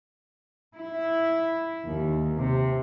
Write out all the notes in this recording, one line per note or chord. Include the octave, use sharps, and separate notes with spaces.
E4
D#2
C3